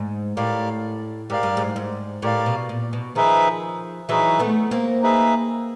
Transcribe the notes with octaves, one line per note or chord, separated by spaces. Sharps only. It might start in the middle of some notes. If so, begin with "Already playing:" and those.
Already playing: G#2
A2 G4 A#4 D5 F5
G#2 G4 A#4 D5 F5
G2
G#2
G#2
A2 G4 A#4 D5 F5
B2
A#2
B2
D#3 F3 D#4 G#4 B4 E5
E3 F#3 D#4 G#4 B4 E5
A3 B3
A#3 C4
D#4 G#4 B4 E5